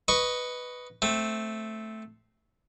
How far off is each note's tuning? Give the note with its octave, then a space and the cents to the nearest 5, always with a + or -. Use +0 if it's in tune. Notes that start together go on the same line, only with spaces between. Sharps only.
B4 +0 D#5 +0 C#6 +0
A3 +0 C4 +0